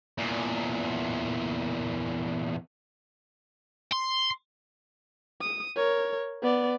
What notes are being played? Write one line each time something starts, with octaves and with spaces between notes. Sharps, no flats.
E2 A#2
C6
D#6
A#4 C#5
B3 D5